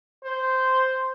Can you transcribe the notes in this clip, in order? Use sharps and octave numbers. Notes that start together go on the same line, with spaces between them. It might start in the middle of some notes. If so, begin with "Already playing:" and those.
C5